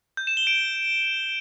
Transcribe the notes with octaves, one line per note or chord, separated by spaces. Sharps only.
G6
E7
G7
D7